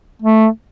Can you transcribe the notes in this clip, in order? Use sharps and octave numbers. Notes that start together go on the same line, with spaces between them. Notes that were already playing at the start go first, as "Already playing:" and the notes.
A3